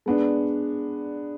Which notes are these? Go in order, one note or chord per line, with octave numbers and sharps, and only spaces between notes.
G#3 B3 D4